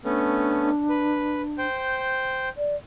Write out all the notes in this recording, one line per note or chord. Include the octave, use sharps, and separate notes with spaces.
A3 B3 C#4 D4
B4
C5 G5
D5